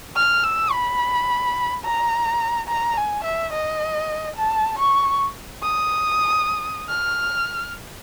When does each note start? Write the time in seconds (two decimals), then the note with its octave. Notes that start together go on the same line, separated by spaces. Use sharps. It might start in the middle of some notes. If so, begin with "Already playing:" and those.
0.16 F6
0.43 E6
0.72 B5
1.84 A#5
2.68 A#5
2.97 G#5
3.24 E5
3.53 D#5
4.37 A5
4.79 C#6
5.63 D#6
6.89 F6